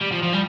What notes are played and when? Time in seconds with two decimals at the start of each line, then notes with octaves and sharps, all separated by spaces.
0.01 G3
0.12 F3
0.23 F3
0.33 G3